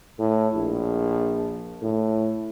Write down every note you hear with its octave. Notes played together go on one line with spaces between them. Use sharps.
A2
A#1
A2